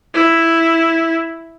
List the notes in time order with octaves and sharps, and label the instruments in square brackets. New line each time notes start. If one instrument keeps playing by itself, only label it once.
[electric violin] E4